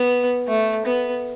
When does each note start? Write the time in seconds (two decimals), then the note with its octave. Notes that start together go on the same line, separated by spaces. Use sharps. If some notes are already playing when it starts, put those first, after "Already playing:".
Already playing: B3
0.48 A3
0.85 B3